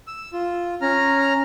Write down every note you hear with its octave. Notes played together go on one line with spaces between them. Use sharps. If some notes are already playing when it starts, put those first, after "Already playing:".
E6
F4
C#4 A#5 F6